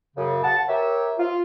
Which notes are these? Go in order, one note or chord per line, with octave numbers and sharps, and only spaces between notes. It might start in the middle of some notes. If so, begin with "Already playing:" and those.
F#2 C#3
F#5 A5
G4 A#4 C#5 E5
F4